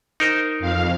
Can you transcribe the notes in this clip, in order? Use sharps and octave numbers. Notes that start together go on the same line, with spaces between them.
D#4 A#4 C5
F2 F5